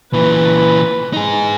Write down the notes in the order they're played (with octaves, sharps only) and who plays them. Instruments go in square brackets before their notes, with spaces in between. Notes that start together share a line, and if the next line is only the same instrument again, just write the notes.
[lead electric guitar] A#2 E3 [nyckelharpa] B4
[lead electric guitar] D#4 G#4